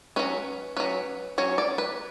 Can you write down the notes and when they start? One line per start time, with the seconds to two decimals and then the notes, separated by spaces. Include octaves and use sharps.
0.16 F#3 C#4 B4
0.77 F#3 C#4 B4
1.38 F#3 C#4 C#5
1.58 D5
1.78 B4